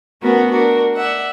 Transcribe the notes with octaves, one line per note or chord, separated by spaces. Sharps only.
A3 B3 C#4 F#4 A#4
D4 F#4 A#4
D5 E5 F#5